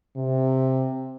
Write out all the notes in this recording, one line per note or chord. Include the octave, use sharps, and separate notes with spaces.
C3